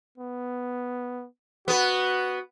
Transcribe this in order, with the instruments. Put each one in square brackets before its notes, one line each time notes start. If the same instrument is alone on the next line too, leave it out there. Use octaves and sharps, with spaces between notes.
[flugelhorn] B3
[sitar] B3 B4 [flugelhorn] F#4